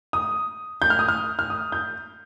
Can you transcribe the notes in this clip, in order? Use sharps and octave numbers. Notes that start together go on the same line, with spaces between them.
D#6
G6
F6
D#6
F6
F6
D#6
G6